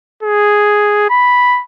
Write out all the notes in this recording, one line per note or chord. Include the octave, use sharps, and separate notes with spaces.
G#4
B5